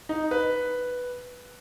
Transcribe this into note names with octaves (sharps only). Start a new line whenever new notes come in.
D#4
B4